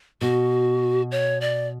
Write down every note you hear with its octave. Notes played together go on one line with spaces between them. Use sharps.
B2 F#4
C#5
D5